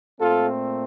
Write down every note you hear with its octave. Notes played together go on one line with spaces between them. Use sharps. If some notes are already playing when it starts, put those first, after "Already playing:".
A#2 A3 C4 F4 A4